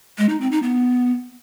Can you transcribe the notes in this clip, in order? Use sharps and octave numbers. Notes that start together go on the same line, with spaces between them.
G#3
D#4
C4
D#4
B3